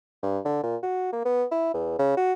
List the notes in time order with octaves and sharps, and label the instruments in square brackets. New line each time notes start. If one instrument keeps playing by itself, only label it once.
[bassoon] G2
D3
A#2
F#4
A#3
B3
E4
E2
C#3
F#4